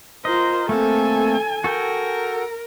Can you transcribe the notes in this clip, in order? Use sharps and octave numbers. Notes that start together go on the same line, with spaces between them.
F4 A#4 C5 D#5
A3 A#3 C4 A4 G#5
F#4 A4 A#4 G5